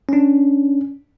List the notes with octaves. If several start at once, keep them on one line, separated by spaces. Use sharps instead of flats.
C#4 D4